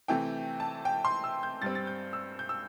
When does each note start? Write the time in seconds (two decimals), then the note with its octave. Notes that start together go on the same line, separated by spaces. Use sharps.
0.08 C3 E3 A3 G5
0.60 A5
0.85 G5
1.05 C6
1.24 E6
1.43 G6
1.62 G2 G3 C4 A6
1.75 A6
1.87 G6
2.13 E6
2.39 G6
2.49 E6